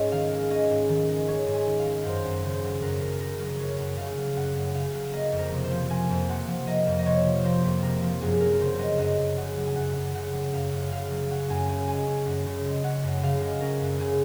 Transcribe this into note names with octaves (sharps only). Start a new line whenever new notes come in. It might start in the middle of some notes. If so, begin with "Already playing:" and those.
Already playing: G#2 G#3 C#4 C#5 D#5
D#3 F5
G#3
C#4 D#5
G#2
D#3
G#3
C#4 C#5
G#2
G#5
D#3
F5
G#3
F#2 C5
F#2
C#3 C5
F#3
F#2 A#4
F#2 A#4
C#3 A#4
F#3 A#4
F#2 C#5
F#2
C#3 F5
F#3
F#2 F#5
F#2
C#3 F5
F#3
A#3 D#5
F2
A#4
C3
C5
F3
A#3 G#5
F2
C3 F#5
F3
A#3 D#5
F2
D#5
C3 C#5
F3
A#3 C5
F2
C3 A#4
F3
F#2 G#4
F#2 A#4
A#4
C#3 C5
F#3 D#5
F#2 D#5
F#2
C#3 F#5
F#3
G#5
F#2 F#5
F#2
C#3 F#5
F#3
F#2 F5
F#2
C#3 F5
F#3
C#4 F#5
F#2 G#5
C#3 G#5
G#3 G#5
C#4
F#2
C#3
G#3
C#4 F#5
F#2
C#3 F5
G#3
C#4 A#4
F#2
C#3 G#4